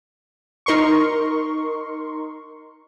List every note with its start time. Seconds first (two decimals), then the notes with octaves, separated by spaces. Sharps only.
0.66 D#4 A#4 C6 C#6